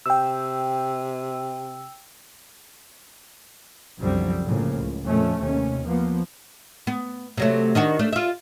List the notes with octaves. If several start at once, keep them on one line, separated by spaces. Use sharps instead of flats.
C3 G5 E6
C2 F#2 D3 F3 G3 C4
A2 C#3 F3 A#3
C#2
F2 A#2 A3 C#4
D#2 C3 C#4
F3 A#3 B3
B3
C3 F#3 A3
D#3 D4 F#4
A3 D4
F4 E5